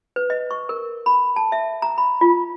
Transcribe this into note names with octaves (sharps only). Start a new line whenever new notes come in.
B4
D#5
C#6
A#4
B5
A5
E5
A#5
B5
F4